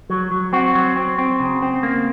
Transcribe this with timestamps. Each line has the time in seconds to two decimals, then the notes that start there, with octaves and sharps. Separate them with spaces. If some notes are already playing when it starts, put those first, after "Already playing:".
0.10 F#3
0.31 F#3
0.53 C4 F#4
0.75 F#3
0.97 C4
1.19 C4
1.40 C#3
1.62 C4
1.83 A#3